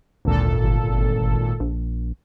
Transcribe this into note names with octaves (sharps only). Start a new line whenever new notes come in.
G#1 D2 A#2 A4
G1
A#1